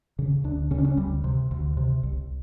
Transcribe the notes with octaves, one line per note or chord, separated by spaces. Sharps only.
C#3
D2 D4
C#3 C#4
D4
C#4
D2 G3
C3
D2
C3
C2